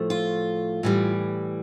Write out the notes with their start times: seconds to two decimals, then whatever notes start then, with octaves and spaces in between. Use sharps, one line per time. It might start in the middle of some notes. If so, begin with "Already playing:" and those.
Already playing: A2 F3 A3
0.10 F4
0.83 A2 E3 G3